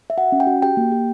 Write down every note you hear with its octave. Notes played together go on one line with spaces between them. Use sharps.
E5
F#4 F#5
C#4
G5
F#4
G4 G5
A#3
G4